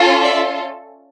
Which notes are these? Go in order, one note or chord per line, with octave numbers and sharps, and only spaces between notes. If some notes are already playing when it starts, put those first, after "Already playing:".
Already playing: C#4 F4 A4
D5 E5